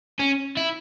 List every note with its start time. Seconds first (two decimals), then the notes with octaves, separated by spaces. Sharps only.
0.20 C#4
0.57 E4